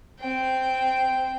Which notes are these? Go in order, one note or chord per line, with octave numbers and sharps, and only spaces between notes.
C4 G5